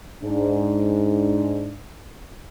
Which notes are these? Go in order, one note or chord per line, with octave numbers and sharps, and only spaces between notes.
G#2 D4